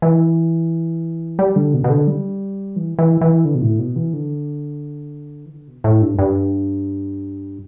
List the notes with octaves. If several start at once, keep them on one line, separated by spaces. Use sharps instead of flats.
E3
G3
D3
B2
B2
D3
G3
E3
E3
E3
D3
B2
A2
B2
E3
D3
E3
D3
B2
A2
G2
G2